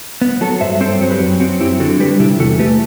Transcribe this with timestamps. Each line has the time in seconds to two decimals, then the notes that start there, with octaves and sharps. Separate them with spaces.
0.21 B3
0.41 F#3 F#4 A4
0.61 G2 C5 E5
0.81 C4 A4 C5
1.01 F#3
1.11 G4 B4
1.20 F#2
1.40 C4 F#4
1.60 F#3 E4 G4
1.80 D3 F#4 A4
2.00 G3 G4 B4
2.20 C3 E4 G4
2.40 E2 F#4 A4
2.59 A3 G4 B4